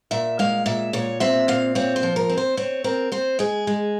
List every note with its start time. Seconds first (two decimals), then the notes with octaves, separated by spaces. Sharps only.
0.11 A#2 E5
0.39 G#3 F5
0.66 A#2 E5
0.93 A#2 C#5
1.20 C4 E5
1.48 A#2 F5
1.75 C4 C#5
1.96 C5
2.03 F3
2.16 A#4
2.29 C4
2.37 C5
2.57 C4 C#5
2.84 C4 A#4
3.12 C4 C5
3.39 G#3 G#4
3.67 G#3